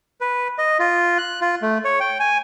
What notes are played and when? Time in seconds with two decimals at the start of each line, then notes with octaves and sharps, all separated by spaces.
0.21 B4
0.58 D#5
0.79 F4
1.18 F#6
1.41 F4
1.62 A3
1.85 C#5
2.00 G5
2.20 G#5